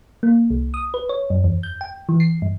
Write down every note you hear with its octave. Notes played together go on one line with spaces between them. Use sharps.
A#3
C2
D#6
B4
C#5
F#2
E2
G6
G5
E3
C7
G2